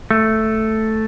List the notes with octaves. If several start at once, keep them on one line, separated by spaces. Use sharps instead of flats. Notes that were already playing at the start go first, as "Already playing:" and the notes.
A3